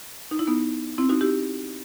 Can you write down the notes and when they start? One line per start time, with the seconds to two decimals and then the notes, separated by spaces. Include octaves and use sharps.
0.31 D#4
0.39 E4
0.47 B3 D#4
0.98 C4 E4
1.09 D#4 F#4
1.21 E4 G4